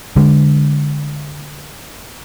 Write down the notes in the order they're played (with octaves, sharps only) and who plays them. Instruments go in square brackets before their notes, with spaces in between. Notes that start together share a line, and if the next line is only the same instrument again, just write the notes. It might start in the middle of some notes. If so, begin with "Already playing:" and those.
[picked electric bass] D3 G#3